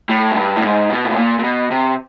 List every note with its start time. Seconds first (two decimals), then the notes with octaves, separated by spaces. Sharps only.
0.10 A2
0.31 F#2
0.36 G2
0.56 A2
0.63 G#2
0.90 B2
1.05 A2
1.16 A#2
1.39 A#2
1.44 B2
1.71 C3